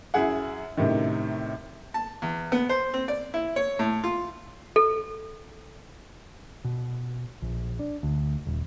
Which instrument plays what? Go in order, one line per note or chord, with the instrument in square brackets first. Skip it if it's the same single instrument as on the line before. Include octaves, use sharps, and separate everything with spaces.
[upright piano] F#2 E4 G#4 F#5
F#2 A2 C3 D#3
[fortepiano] A5
E2
B3
C5
C4
D5
E4
C#5
A2
F4
[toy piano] A4
[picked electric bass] B2
A#1
D4
D2
D#1